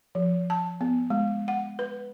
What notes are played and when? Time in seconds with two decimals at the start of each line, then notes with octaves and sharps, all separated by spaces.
0.15 F3
0.50 A5
0.81 B3
1.10 G#3
1.48 F#5
1.79 B4